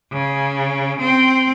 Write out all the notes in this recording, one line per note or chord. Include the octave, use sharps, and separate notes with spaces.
C#3
C4